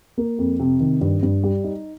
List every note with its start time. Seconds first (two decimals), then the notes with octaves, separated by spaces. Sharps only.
0.18 A#3
0.38 F2
0.60 C3
0.80 D#3
1.01 G2
1.23 G2
1.43 G3
1.64 D#4